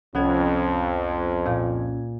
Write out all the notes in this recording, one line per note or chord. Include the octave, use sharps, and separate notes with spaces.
C2 F2 B3 C#4 G#6
A#2